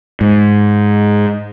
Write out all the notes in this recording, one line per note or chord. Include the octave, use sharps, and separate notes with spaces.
G#2